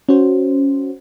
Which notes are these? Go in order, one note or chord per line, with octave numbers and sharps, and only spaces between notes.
C#4 F#4 C5